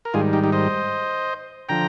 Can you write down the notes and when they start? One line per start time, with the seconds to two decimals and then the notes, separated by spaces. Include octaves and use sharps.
0.05 A#4
0.14 G#2 D#3 G3 F4 G#4
0.33 D#4 G4
0.44 D#4 G4
0.52 C5 D#5
1.69 D3 F3 G5 A#5